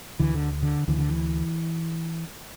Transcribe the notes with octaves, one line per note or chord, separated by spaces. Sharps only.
D2 D3 E3
D3
D3
D2 D3 E3
D3
E3